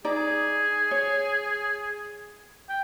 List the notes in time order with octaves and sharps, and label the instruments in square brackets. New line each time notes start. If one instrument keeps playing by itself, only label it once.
[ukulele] D#4 D5 [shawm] G#4
[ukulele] C#5
[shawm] G5